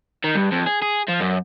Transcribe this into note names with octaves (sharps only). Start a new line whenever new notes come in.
D#3
G2
F2
G#4
G#4
F3
F#2